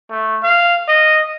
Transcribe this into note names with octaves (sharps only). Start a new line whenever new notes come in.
A3
F5
D#5